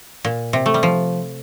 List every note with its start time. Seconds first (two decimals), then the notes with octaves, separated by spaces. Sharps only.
0.25 A#2
0.53 C3
0.66 A3
0.74 G3
0.83 F3